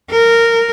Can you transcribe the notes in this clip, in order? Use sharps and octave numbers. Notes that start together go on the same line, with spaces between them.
A#4